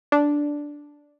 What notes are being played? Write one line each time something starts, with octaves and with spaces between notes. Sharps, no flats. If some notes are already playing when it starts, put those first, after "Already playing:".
D4